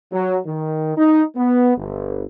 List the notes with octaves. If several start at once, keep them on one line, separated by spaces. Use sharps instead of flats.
F#3
D#3
D#4
B3
G1